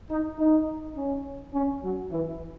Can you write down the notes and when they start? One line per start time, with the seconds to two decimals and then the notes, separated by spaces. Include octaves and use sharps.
0.10 D#4
0.39 D#4
0.96 C#4
1.54 C#4
1.83 F#3
2.11 E3